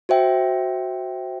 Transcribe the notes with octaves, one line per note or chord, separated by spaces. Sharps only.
F#4 C5 E5 G5